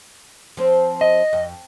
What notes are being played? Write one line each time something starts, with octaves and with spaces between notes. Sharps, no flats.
F3 C4 C5
D#5
F2